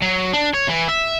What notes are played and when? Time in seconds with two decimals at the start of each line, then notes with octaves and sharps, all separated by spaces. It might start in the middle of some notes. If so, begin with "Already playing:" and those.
0.02 F#3
0.34 D4
0.55 C#5
0.69 E3
0.89 E5